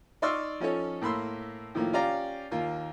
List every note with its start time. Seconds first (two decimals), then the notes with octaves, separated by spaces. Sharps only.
0.22 D#4 D5 C6 C#6 E6 F6
0.60 F3 C#4 D#4 A4 C#5
1.01 A2 A#3 B5 C6 E6
1.75 A2 D#3 F3 A#3
1.93 C#4 F4 G4 D5 F5 A#5
2.51 D#2 A#3 F4